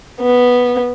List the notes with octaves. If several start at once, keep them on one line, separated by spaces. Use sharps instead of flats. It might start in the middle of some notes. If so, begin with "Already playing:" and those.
B3